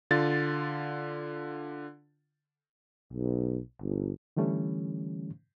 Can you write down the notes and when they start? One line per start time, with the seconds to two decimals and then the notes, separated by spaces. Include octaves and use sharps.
0.11 D3 F4 A6
3.13 B1
3.81 G1
4.37 D3 E3 G3 A3 C#4